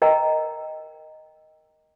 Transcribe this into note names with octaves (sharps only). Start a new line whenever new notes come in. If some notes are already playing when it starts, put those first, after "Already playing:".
A#4 D#5 G5 A#5